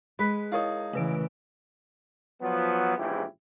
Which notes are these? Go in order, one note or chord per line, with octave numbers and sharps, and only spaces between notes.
G#3 B4 B5
D#4 E4 A#4 C#5 F5
C#3 E3 A3 B4 D7
F3 F#3 B3
A#1 E2 G#2 C#3 E4 G4